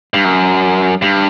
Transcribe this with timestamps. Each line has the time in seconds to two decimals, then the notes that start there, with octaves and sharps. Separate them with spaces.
0.14 G2
0.24 F#2
1.02 G2